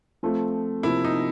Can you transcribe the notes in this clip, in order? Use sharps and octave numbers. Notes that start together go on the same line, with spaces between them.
F3 A3 C4 F4
C3 F3 A#3 E4
D#4